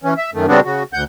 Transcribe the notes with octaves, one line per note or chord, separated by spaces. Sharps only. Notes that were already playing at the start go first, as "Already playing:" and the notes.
E3 C#4
E5
F#2 D#3 A3
C#3 G3 B3 C4 D4 F#4
C#3 F#4
D2 F#5 G6